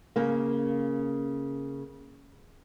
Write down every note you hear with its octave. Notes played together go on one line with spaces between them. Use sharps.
C#3 A#3